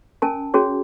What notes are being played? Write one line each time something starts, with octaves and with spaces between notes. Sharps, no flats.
C#4 A#4 G#5 A5
C#4 F#4 G#4 C#5